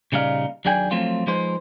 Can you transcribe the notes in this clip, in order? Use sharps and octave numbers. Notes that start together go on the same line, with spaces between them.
A#2 C#3 G3 D#4 F5
D#2 F#3 D4 G#4 G5 G#5
F3 F#3 A3 C4 F4
F3 G#3 D#4 B4 C5